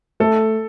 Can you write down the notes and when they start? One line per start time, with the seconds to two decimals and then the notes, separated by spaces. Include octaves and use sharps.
0.20 A3 A4